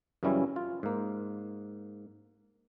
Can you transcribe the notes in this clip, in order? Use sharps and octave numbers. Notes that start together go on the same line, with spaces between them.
F#2 C#3 E3 G3 C#4 E4
F4
G#2 A#3